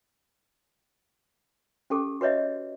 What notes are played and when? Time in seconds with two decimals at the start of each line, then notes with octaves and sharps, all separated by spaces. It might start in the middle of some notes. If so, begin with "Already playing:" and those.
1.90 C#4 G4 A4 D6
2.21 F#4 B4 C#5 D#5 E5